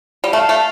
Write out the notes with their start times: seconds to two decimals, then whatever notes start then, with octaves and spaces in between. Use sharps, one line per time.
0.24 G3
0.33 A3 F5
0.49 A3